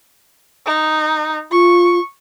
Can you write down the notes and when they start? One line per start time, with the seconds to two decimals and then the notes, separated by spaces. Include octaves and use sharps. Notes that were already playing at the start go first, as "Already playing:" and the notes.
0.66 D#4
1.52 F4 C#6